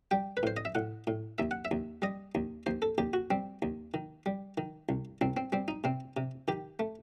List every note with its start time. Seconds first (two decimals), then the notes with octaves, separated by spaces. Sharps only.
0.11 G3 G5
0.37 B4
0.43 A2 C5
0.57 D#5
0.65 E5
0.75 A2 F#5
1.07 A2
1.38 D#2 E5
1.51 F#5
1.65 E5
1.71 D#2
2.02 G3 D#5
2.35 D#2
2.66 D#2 C5
2.82 A4
2.98 D#2 G4
3.13 F#4
3.31 G3 C4
3.62 D#2
3.94 D#3
4.26 G3
4.58 D#3
4.89 C2
5.21 C2 C4
5.37 C4
5.52 G3 C4
5.68 D#4
5.84 C3 C4
6.17 C3
6.48 D#3 G4
6.79 A3